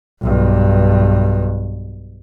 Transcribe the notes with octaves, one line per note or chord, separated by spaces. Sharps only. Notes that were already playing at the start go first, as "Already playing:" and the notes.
B1 G2